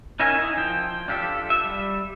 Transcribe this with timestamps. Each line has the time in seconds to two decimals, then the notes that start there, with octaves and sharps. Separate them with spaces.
0.20 C#4 D#4 A#4 E5 G#5
0.40 D#4 E4
0.57 F3 G5
1.08 D4 F4 G4 A4 E5
1.50 E5
1.64 G3